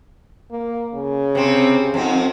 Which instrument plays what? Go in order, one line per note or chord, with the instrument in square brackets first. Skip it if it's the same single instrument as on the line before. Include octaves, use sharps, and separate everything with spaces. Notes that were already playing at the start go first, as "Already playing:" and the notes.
[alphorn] A#3
C#3
[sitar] C3 C4
F2 C4 D#4